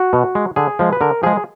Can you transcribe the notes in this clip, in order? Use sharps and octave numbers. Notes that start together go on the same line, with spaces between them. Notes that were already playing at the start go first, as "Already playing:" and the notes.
Already playing: F#4
B2
G#3
D3 G#4
F3 G#3
B4
D3 A#4
F3 G#3 G#4